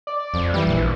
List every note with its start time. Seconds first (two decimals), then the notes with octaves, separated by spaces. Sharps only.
0.07 D5
0.34 F2
0.54 E3 G3
0.67 A#1